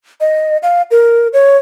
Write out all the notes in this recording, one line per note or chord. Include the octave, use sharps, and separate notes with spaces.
D#5
F5
A#4
C#5